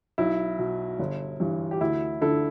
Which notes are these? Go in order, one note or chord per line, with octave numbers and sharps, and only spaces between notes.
B1 E4
B2
G1
G2 E3
G4
D2 E4
D3 E4 A4